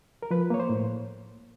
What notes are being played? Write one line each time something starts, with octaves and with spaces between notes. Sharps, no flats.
A#4
F3 B4
A#3 C#5
C5
A2